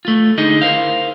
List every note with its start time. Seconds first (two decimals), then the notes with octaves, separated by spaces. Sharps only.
0.05 A3 F4
0.38 D3 D#4 G#4 D#5
0.62 E4 A#4 C5 F5